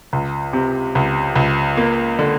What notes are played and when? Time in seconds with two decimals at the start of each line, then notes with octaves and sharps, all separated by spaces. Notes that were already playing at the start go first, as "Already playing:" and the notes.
0.13 C#2
0.53 C3
0.95 C#2
1.36 C#2
1.77 A#3
2.19 D3